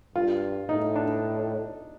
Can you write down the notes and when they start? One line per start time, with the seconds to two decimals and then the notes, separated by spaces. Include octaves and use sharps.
0.15 G2 F4
0.68 A2 D#4
0.96 D4